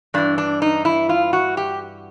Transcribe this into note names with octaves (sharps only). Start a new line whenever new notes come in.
G2 E3 D4
D4
D#4
E4
F4
F#4
G4